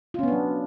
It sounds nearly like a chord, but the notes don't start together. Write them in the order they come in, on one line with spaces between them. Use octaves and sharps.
F4 C#4 B3 D4 F#3